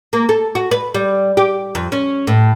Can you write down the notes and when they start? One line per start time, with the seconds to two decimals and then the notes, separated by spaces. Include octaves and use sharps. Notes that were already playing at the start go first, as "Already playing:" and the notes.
0.13 A#3
0.29 A4
0.55 F#4
0.71 B4
0.94 G3
1.37 G4
1.75 F2
1.92 C#4
2.27 A2